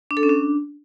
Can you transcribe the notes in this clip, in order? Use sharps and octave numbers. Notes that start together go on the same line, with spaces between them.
D4
A4
C#4
D4